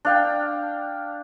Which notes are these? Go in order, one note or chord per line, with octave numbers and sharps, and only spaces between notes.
D4 F5 G5